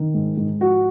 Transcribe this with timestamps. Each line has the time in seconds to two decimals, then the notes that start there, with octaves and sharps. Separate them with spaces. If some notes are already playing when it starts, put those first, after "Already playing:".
Already playing: D#3
0.14 G#2
0.37 G#2
0.60 F3 F#4